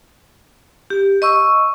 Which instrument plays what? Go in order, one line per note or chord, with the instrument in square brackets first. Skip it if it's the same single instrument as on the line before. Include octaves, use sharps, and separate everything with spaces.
[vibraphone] G4
D#5 C#6 E6